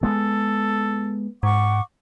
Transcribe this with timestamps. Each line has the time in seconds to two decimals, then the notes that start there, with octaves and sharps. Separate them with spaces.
0.03 G#3 B3 A4
1.43 G#2 F#5 C#6 D6